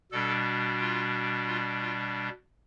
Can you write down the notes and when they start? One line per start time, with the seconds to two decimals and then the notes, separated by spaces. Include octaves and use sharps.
0.12 B2 G3 D4 A4
0.80 F4
1.47 F4
1.82 F4